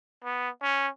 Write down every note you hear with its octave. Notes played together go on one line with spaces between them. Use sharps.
B3
C#4